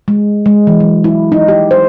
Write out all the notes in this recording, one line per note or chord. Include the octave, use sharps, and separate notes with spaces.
G#3
G#3
E3
F#3
E4
D#4
G4
C5